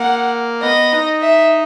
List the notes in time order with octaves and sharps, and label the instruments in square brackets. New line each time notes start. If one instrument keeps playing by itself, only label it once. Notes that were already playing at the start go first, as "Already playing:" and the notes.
Already playing: [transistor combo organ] A#3 [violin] F#5
[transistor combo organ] B3 [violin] D#5
[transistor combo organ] D#4
[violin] E5